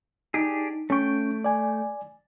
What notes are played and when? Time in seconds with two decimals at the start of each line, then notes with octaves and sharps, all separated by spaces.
0.34 D4 D#4 G4 G#4
0.90 A3 C#4 G5 C#6
1.44 D5 G#5